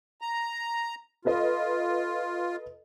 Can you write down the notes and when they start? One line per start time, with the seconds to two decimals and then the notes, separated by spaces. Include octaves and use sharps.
0.21 A#5
1.25 F4 A4 B4 D#5